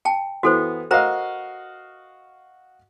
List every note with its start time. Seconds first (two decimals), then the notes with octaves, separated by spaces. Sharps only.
0.05 G5 A5
0.43 E3 B3 F#4 A4 C5
0.91 F#4 A#4 C5 D#5 F5 A#5